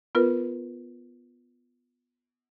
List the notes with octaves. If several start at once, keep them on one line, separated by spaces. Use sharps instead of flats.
B3 F4 A#4 B4